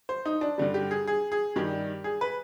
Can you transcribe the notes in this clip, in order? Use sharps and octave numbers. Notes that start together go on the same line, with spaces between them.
C5
D#4
D4
G2 D3 G3
G4
G#4
G#4
G#4
G2 D#3 G3 G4
G#4
B4